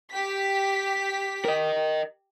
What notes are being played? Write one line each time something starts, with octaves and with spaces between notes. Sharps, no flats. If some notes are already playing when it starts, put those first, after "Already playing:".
G4 B6
A#4 D#5